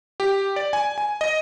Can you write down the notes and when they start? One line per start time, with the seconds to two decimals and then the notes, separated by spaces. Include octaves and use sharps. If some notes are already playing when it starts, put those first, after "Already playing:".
0.20 G4
0.56 D5
0.73 G#5
0.98 G#5
1.21 D#5